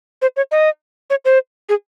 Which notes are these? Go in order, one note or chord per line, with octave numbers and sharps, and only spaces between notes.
C5
C#5
D#5
C#5
C5
G#4